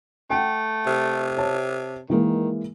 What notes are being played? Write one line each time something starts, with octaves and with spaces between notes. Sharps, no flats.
A3 F#5 G5
C3
C#5 A5
D#3 E3 G#3 A#3